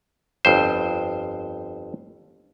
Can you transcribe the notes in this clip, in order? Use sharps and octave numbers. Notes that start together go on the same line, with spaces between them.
G1 F2 C5